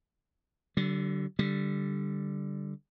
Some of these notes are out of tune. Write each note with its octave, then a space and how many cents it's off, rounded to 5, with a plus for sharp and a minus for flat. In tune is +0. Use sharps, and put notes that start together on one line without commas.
D3 +0 G3 -45
D3 +0 G3 +0